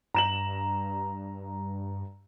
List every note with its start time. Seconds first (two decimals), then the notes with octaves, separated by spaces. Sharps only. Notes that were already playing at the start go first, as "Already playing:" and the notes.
0.14 G2 A#5 E7 F#7